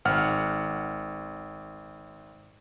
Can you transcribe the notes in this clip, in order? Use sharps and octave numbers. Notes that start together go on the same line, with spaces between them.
G#1 F#5 F6